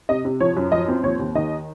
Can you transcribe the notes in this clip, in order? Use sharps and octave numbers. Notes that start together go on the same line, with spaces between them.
C3 D#5
C3
F3 C#5
F#2
F3 D#5
C4
D#2 C#5
D#2
D#3 D#5